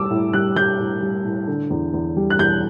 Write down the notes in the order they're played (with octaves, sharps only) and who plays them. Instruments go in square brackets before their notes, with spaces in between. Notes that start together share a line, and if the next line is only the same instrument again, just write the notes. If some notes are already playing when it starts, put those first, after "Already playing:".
Already playing: [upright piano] A2 G3 D6 E6
A2
G3 F#6
G3 G6
A2
G3
A2
D3
E2
E2
G3
F#6
E2 G6